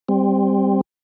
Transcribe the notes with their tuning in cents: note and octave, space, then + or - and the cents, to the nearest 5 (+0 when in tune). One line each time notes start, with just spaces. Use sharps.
G3 +10 C4 +0